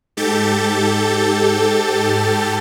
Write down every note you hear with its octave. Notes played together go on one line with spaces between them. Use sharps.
G#2 G4 A4 G6 A6